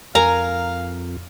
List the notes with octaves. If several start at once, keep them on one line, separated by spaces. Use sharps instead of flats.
F2 A#4 F5 G#5 A#5